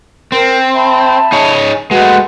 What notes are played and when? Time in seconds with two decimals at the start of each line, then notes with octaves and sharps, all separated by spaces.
0.32 C4 A#4
0.74 E5 A5 B5
1.32 D#4 G#4 C#5
1.91 G#3 A3 F#4 B4 F#5